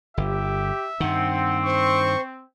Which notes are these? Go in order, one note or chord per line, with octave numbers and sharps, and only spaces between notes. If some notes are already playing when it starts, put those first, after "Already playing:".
G1 G4 E5
G2 D#3 C4 F#5
C5 C#6